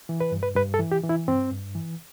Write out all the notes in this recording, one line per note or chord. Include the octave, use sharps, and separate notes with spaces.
E3
B4
G2
B4
G2 B4
A4
E3
G4
E3
E4
G2 C4
G2
E3